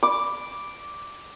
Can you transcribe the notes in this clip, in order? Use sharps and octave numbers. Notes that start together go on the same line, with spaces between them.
D6